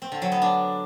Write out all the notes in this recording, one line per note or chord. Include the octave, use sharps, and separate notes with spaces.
C4
D3
F#3
B3
D4